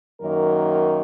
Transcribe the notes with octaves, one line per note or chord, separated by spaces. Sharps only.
F#2 D#3 F#3 A#3 A#4